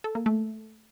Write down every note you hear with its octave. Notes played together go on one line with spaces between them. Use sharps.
A4
A#3
A3